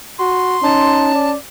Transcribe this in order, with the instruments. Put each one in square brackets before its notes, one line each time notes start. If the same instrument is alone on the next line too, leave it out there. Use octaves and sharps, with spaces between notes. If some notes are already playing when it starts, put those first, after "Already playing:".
[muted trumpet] F#4 [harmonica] C6
[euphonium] C#4 [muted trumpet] D#4 [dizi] A5
[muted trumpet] D5